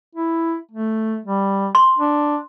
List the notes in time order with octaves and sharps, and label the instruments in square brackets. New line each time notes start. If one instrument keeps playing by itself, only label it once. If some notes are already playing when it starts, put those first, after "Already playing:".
[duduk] E4
A3
G3
[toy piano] C6
[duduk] D4